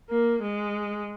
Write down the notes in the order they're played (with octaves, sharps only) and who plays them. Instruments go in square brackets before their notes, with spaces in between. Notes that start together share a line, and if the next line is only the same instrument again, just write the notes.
[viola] A#3
G#3